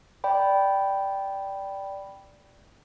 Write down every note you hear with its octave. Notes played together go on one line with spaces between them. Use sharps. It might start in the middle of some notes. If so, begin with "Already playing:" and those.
D5 G5 B5